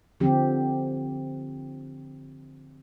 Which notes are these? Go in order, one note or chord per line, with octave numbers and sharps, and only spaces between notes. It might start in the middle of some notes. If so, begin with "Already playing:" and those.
D3 F3 C4 G4